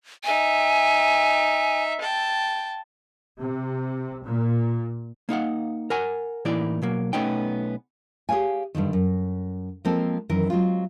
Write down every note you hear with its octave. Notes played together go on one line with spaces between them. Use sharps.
D#4 E5 G#5
G5 A5
C3
A#2
A#3 D#4 F5 F#5
A#4 F#5 G#5
A2 E3 A#3 D#4 E4 D5
B2 F#3 A#3
B1 A3 B3 C#4 D#4 G5
G4 G#4 C5 C#5 F5 G#5
G2 A#2 D3 D#3
F#2
F3 G#3 A#3 C4 A4
F#2 D#3 E3 A#4
F#3 G#3 C4 F4